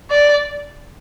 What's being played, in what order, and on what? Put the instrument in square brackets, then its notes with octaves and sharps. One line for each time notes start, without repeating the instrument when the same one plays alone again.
[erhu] D5